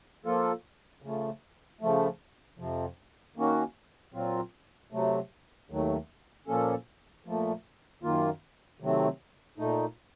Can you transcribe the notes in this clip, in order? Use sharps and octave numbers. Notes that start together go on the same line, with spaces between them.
F3 A#3 F4 A4
C#3 F3 A3
C#3 F3 A3
F2 C3 F3
D#3 A#3 C#4 F#4
A#2 F#3 C4 F4
C3 F#3 A3
D#2 D#3 F#3 A3
A#2 F3 A#3 C#4 A4
A#2 F3 A3
F#2 D#3 A#3 F4
C3 D#3 F#3 A3 C4
A#2 A3 D#4